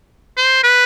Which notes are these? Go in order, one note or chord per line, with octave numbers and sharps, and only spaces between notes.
C5
B4